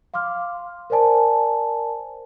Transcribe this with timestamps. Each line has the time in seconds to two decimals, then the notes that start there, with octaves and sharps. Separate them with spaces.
0.14 F5 C6 D6 F6
0.90 A#4 C5 D5 G#5 A5